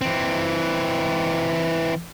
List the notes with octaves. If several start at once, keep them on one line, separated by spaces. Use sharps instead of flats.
E3 C4